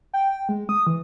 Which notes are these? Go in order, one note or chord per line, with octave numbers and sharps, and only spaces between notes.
G5
G#3
D#6
E3